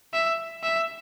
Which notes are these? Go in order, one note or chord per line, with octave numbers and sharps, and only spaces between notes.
E5
E5